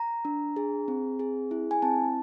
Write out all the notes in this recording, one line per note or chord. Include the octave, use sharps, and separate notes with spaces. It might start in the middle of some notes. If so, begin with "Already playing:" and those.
Already playing: A#5
D4
G#4
C4
G#4
E4
G#5
C4 A5